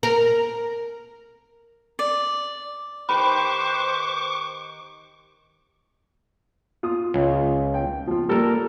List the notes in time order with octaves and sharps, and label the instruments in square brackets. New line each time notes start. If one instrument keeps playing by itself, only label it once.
[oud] A#4
[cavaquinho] D5
[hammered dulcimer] D#3 G4 [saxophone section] B4 C5 [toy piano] B5 [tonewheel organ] C#6 D6
[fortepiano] F4 D#6
[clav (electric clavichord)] C#2
[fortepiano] G5
F3 F4
[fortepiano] G3 A#3 [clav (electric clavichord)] A4 A#4